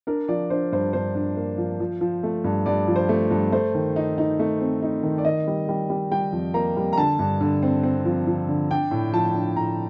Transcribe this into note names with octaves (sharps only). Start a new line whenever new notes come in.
D4 A#4
F3 D5
D4 C5
G2 C5
G2 C5
D4
A#3
F3
F3
F3
A3
G2
G2 D5
F3
C5
A3
G2
A3 C5
D#3
D#4
D#4
A3
C4
D#4
D#3
D5
D#3 D#5
G3
G3
G3
G3 G5
F2
A#3 A#5
G3
A#5
D3 A5
G2
D3
C4
C4
F3
F3
D3
D4 G5
A2
F3 A5
D4
A2 A#5